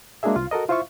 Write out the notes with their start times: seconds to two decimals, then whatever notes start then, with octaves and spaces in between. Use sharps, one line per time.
0.23 G#3 A#3 D4 F#4 G#4 E5
0.36 C2 F4 F5
0.51 F#4 A4 A#4 D#5
0.69 E4 F4 C5 E5 F5 C#6